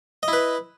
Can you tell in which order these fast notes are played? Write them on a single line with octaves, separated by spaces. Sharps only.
D#5 E4 B4